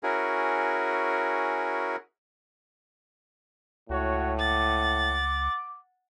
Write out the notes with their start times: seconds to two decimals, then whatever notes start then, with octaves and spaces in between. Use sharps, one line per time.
0.03 C#4 E4 F#4 G#4 A#4
3.89 C#2 A2 F#4 C#5 F#5
4.38 F#5 D6 A6